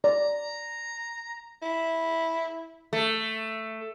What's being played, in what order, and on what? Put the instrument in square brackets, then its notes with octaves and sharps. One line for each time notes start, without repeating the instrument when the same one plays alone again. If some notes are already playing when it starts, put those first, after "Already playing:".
[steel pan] D5 [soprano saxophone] A#5
[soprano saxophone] E4
[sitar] A3